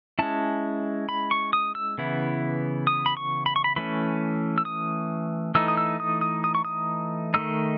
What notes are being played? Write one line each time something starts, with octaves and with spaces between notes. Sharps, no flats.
G#3 C#4 E4 A5
B5
C#6
D#6
E6
C#3 E3 B3 E4
D#6
B5
C#6
B5
C#6
B5
E3 A3 C#4 B5
E6
D#6
E3 A3 D#4 E6
D#6
E6
D#6
D#6
D#6
C#6
D#6
D#3 A3 D#4 E6